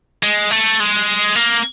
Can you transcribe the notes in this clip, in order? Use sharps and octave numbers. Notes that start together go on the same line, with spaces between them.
G#3
A3
G#3
A#3